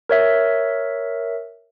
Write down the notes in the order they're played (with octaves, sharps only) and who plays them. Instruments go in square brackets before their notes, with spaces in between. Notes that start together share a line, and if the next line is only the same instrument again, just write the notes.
[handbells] A#4 C#5 E5